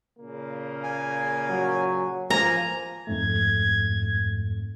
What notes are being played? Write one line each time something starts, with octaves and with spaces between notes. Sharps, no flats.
A#2 C#3 A#3
G#5
F#3
F3 A#3 G#5 A#5
F2 G#2 A3 G#6